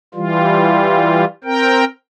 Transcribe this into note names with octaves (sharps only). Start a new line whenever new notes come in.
E3 G3 F4
C4 A#4 G5